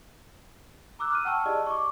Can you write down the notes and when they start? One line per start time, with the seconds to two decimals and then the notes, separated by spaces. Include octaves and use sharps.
0.99 A#5 D6 E6 F#6
1.11 F6 F#6 D#7
1.25 F#5 G5 A5 C#6 E6 F6
1.46 E4 G4 G#4 D5 D#5 A5
1.67 C#6 D6